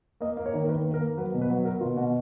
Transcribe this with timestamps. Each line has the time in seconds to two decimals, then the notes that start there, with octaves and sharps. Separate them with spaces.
0.21 A#3 D#5
0.37 A#3
0.46 C#5
0.54 D#3
0.64 A#4
0.69 D#3 B4
0.85 A#3
0.94 A#4
1.01 A#3
1.17 F#3 B4
1.34 B2
1.41 B4
1.50 F#3
1.65 B3 A#4
1.81 B2 F4
1.97 B2 F#4